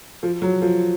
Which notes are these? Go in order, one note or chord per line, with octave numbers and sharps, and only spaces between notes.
F3
F#3
F3